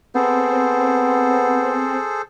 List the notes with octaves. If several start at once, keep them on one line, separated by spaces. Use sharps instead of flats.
B3 C4 G#4 A4 C5